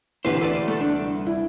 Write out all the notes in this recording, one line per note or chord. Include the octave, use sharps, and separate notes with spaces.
D2 E3 G4 B4 C5
A4 B4 D5
A3 A4
D4
C2
E4